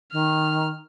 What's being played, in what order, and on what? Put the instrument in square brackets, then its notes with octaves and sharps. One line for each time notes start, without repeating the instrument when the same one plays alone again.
[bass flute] D#3 [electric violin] F6